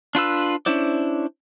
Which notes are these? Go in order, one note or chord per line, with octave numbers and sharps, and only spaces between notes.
D4 F4 B4 E6
C#4 D4 E4 C5 D5